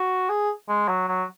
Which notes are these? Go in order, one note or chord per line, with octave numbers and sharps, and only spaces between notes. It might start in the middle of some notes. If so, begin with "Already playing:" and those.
Already playing: F#4
G#4
G#3
F#3
F#3